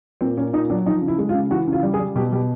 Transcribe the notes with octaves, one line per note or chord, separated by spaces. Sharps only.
A#2 C4
A#2 C#4
A#2 D#4
F#3 D4
F3 D#4
C#3
E4
G#3
F4
C#3
E3 F#4
C#3
F4
G3
G#4
G3
B2 G4
B2 G4